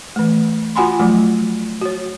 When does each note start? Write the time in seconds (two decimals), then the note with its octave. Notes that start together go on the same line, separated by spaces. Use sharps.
0.16 E3 A3
0.76 F4 F#4 F#5 G#5 B5 C6
1.00 F3 F#3 A3
1.81 F#4 C#5